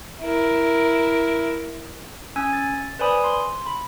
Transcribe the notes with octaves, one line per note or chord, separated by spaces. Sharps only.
E4 A#4
C#4 G#5 E6 G#6
A6
B4 C5 D5 G#5 B5 D#6
C6
B5